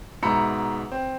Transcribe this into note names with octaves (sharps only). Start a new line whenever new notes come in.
G#2 B2 E5 A#5 B5 C#7
C4